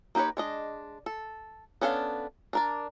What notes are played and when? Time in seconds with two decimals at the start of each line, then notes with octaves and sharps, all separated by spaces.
0.15 A#3 D#4 G4 B4 C#5
0.37 G#3 D4 D#5
1.06 A4
1.81 B3 C#4 D4 A4 F5
2.53 D4 A#4 D5